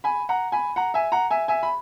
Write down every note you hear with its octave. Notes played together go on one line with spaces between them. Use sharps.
G#5 B5
F#5 A#5
G#5 B5
F#5 A#5
E5 G#5
F#5 A#5
E5 G#5
E5 G#5
B5